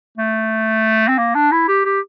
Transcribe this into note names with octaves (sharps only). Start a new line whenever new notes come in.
A3
C4
A#3
D4
E4
G4
G4